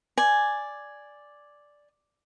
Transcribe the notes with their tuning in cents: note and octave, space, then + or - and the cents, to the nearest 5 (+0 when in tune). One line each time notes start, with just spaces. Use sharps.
D5 +0 G#5 +0